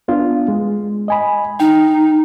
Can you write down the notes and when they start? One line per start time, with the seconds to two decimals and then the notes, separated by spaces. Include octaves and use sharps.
0.08 B3 D4 F4
0.48 G#3
1.08 D#5 G#5 B5
1.60 D#4 G5